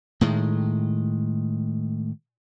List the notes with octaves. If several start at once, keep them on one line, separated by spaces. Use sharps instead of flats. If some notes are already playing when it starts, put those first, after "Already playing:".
A2 D#3 G#3